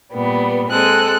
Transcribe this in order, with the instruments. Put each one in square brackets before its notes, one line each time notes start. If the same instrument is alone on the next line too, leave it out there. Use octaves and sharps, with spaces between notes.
[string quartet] A#2 G3 B3
[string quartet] G#3 C4 [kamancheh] A4 F#6